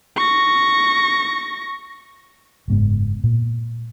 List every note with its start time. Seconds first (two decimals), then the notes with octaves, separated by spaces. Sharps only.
0.16 C#6 A#6
2.68 F#1 G#2 B3
3.24 A#2